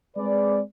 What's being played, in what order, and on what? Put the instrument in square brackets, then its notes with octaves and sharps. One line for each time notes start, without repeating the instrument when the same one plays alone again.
[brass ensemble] G#3 C4 G#4 B4 D5